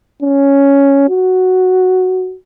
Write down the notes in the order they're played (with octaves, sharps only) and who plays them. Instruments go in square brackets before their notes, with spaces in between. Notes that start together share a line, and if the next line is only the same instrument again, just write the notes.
[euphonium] C#4
F#4